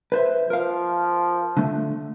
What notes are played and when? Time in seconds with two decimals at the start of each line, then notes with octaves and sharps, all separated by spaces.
0.12 B4 C5 E5
0.50 F3 A#4 F5
1.57 D3 A3